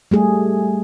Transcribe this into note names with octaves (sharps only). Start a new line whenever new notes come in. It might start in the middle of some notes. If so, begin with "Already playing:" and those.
G3 A3 G#4